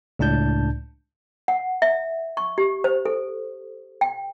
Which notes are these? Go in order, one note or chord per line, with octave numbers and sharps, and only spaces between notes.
C#2 A2 D4 A5 G6
F#5
E5
C#6
G4
C5
A4
G5